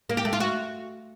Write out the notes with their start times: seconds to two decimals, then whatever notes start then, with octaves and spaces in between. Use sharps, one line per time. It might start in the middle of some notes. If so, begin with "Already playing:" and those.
0.09 A#3
0.17 G4
0.25 A3
0.33 F4
0.40 F#4